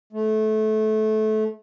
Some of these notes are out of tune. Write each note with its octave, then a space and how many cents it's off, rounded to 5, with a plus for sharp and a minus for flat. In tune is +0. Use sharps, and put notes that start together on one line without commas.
A3 -20